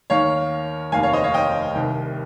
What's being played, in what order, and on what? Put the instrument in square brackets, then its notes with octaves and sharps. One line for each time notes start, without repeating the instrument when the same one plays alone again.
[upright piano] D#2 D#3 C#5 F5
F1 D#2 D#3 F5 G#5
C#5 F5
C5 D#5
C#5 F5
D#5 G5
C2 C3 D#3